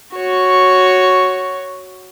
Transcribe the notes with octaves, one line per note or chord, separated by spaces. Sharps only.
F#4 C#5